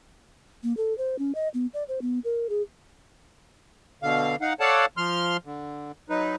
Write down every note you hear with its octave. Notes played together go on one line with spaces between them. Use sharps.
A#3
A4
C5
C#4
D#5
B3
D5
C5
B3
A#4
G#4
B2 D3 F5
D#4 F5 F#5
A4 C#5 D5 F5 F#5 A5
F3 C6 F6
D3
F#3 D#4 B4